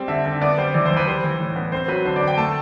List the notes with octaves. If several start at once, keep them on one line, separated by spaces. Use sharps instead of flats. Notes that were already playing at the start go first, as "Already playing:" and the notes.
Already playing: G3 C4
D3 E5
D3
B3 D5
G3 C5
E3 D5
C5
E3
B4
G3 C5
E3
A2
B3
C4 C5
F#3 B4
D3 C5
D5
D3
G5
A3 A5